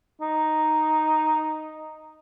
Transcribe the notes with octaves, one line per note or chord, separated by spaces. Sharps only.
D#4